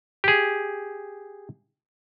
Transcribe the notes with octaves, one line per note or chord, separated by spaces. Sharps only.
G4 G#4